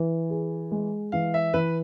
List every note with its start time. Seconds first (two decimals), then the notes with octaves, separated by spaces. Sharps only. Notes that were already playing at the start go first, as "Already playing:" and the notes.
Already playing: E3
0.30 G#4
0.71 G#3
1.12 E3 F5
1.34 E5
1.54 E3 B4